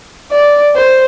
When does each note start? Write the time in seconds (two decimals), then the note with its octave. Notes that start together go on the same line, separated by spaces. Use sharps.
0.32 D5
0.75 C5